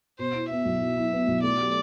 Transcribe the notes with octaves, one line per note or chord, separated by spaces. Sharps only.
B2 C5
E4
B3 E5
B1
B2
E4
B3
B1
A3 D5
G4